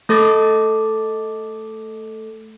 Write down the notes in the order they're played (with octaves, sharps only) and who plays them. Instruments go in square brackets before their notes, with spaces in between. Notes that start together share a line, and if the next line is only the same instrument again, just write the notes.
[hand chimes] A3 A4 D6 A6